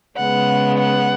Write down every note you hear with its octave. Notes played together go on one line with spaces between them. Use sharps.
C#3 G#3 B3 F#5
F#5